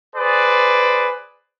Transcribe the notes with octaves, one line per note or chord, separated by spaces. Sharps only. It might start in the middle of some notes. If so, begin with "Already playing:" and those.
G#4 B4 C5 D5